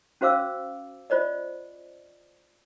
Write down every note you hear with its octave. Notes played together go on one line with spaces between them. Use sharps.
C#4 F#4 C5 F5 D6 E6
F4 C5 D5 D#5